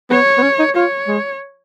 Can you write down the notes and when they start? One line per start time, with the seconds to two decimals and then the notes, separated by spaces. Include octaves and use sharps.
0.10 B3 C#5
0.37 B3
0.43 C#4
0.59 D#4
0.75 F4 C#5
1.08 G#3